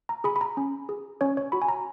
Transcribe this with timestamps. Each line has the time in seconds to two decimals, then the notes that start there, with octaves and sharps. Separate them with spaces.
0.09 A#5
0.24 G#4 B5
0.36 B5
0.41 A#5
0.57 C#4
0.89 G#4
1.21 C#4 C#5
1.37 C#5
1.52 F#4 B5
1.62 G#5
1.68 A#5